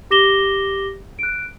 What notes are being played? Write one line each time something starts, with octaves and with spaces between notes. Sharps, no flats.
G4 D6 A#6 E7 G7
F#6 D7